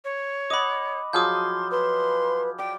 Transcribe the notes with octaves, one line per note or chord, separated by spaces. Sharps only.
C#5
D#5 F#5 B5 D6
F3 F#3 G#4 C6 D6 F6 G6
B4 C6
D5 G5